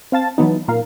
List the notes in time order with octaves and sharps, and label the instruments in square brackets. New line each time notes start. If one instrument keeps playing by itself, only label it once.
[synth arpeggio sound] C4 F5 A5 A6
E3 F#3 B3 D#4
A#2 A#4 F5